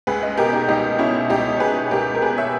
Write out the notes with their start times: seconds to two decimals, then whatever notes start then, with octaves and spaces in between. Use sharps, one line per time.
0.07 C#2 G#4 B4
0.23 B4 D#5
0.37 B2 G4 A#4
0.53 D#4 G4
0.68 C#2 D#4 G4
0.99 B2 C#4 E4
1.30 C#2 D#4 G4
1.56 C#5
1.60 B2 G#4 B4
1.91 C#2 G4 A#4
2.15 A#4
2.22 B2 G#4 B4
2.38 C#5 E5